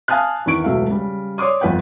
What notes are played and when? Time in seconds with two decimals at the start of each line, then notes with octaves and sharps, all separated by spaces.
0.08 F5 G#5 A5 D#6 F6 F#6
0.46 E2 D#3 C#6 D7
0.64 E1 C#2 F#3 A3 E5 F5
0.90 C#3 G3
1.38 C#5 D5 C6 D6 D#6
1.61 G1 F2 B3 B4 F#5 G5